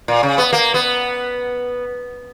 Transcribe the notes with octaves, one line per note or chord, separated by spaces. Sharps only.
A#2
C#3
B3
A#3
B3